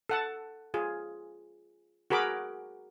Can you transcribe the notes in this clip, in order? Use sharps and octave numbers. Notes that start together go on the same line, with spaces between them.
A4 F#5 A5
F4 G#4
F#4 G#4 A#4 B5 D6